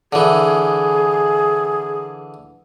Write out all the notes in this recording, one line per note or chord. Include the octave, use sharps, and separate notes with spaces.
D3 E3 G#4